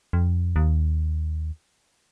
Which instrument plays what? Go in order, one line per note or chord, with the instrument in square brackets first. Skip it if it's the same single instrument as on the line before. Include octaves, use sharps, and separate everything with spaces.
[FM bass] F2
D#2